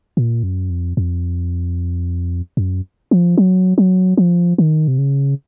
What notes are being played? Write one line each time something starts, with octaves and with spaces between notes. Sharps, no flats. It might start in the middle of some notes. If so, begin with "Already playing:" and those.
A#2
F#2
F2
F2
F#2
F3
F#3
F#3
F3
D#3
C3
C#3